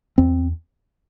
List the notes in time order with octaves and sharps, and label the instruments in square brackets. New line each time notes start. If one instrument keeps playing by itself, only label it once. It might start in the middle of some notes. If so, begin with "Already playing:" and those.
[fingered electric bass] E2 C4